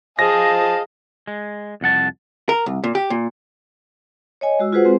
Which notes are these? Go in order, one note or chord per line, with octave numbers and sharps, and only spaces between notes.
F3 G#4 D#5 F5 A5 A#6
G#3
C2 F2 F#5 A5
A#4
C2
A#2
G4
A#2
C#5 D#5 G#5
G#3 F#4 E6
F4 F#4 G#4 B4 C5 F#5
G#3 C4 G#4